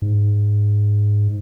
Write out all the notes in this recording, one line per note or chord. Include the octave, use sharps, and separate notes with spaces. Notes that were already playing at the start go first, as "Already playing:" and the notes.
G#2